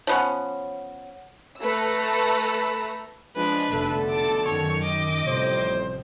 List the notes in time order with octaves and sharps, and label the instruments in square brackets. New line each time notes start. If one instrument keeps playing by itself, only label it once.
[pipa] F3 B3 C#4 [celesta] C#5 F#5
[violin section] A3 A4 B4 A#5 E6
[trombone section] F3 G#3 [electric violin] D4 B4
[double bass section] F1 A3 [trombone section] B2 D3 A4
[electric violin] A5 D6
[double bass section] F#2 D#3 [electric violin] C#5 C#6
[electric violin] D#5 D6
[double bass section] A1 C3 F3 [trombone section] A2 G3 C5